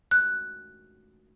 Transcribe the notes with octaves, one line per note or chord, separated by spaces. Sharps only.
F#6